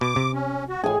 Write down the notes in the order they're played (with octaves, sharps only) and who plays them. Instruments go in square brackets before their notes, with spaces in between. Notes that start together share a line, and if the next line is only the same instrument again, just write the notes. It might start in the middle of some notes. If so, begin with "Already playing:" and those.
[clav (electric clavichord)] B2 [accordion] D6
[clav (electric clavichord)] C3
[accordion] C#4
F#4
[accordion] A2 [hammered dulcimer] G#4 G#5